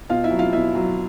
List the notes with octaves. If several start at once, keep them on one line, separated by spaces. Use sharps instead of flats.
B2 F4 F5
E4 E5
F#3
F4 F5
B2 E4 E5
F#3